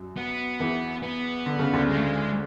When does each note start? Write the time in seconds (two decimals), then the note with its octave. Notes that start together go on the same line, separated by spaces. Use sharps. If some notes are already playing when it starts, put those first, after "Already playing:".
Already playing: F#2 F#3
0.17 B3
0.60 E2 E3
1.03 B3
1.46 D3
1.59 C#3
1.73 D2 D3
1.90 G#3
1.97 A3
2.04 G#3